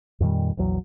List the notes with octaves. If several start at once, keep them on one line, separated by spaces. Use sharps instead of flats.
F2 A#2 D#3 G3
A#1 E2 F#3